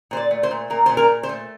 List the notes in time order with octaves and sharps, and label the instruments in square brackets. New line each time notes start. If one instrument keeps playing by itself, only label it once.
[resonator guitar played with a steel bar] A#2 C5
D5
A3
C5
A#2
A#2 A#4
A#2 C5
A#4
A#2
C5
A3